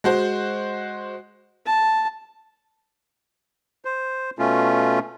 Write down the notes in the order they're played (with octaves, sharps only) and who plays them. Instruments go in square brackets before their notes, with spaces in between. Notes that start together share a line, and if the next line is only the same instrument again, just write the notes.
[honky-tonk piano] G#3 F#4 C5
[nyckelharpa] A5
[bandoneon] C5
B2 A3 C#4 F4